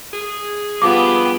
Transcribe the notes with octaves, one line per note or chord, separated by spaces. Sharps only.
G#4
G2 F3 B3 G4 D6